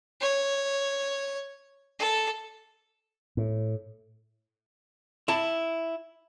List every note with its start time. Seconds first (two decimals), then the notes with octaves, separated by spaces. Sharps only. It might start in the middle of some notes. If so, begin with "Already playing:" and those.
0.21 C#5
2.00 A4
3.37 A2
5.28 E4 A5